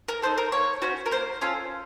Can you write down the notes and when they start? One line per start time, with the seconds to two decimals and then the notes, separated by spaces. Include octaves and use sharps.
0.08 A#4
0.22 D#4 A4 C5
0.38 A#4
0.52 A#3 C#5
0.82 C#4 F#4 C5
1.06 A#4
1.11 A#3 C5
1.41 C#4 F4 A4